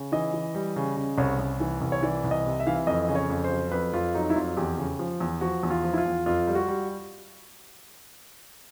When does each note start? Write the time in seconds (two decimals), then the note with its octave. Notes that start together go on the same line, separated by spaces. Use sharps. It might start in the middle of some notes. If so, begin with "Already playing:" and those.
Already playing: C#3
0.12 E3 D#5
0.33 E3
0.54 G3
0.76 C#3
0.97 C#3
1.18 C2 C#5
1.39 C2
1.60 E3
1.81 C2
1.92 C#5
2.03 E3 D5
2.24 C2
2.31 D#5
2.45 C3
2.60 E5
2.67 E3 F5
2.75 E5
2.87 F2 D#5
3.08 C#3
3.15 C#5
3.30 F2
3.44 C5
3.51 F#3
3.72 F2 B4
3.93 F2 F4
4.14 F#3 D#4
4.30 E4
4.36 F2 F4
4.57 E2 G4
4.78 C#3
4.99 F3
5.20 E2
5.41 F3 F#4
5.63 E2
5.70 F4
5.84 F3
5.93 E4
5.98 F4
6.05 E2
6.26 F2 F4
6.48 G3
6.55 F#4
6.68 G3